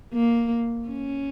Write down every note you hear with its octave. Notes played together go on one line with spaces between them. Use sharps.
A#3
C#4